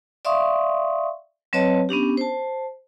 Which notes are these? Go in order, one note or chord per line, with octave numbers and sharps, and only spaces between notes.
D5 E5 F5 C6 C#6 D#6
F#3 C4 B4 C#5 D#5 A5
B3 C#4 D4 G4
C5 A5